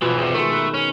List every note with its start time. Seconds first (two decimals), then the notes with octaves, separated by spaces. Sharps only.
0.02 B1 B2 E3 F3
0.17 E2 C3
0.34 D#3 G#3 A3
0.52 B4
0.74 C#4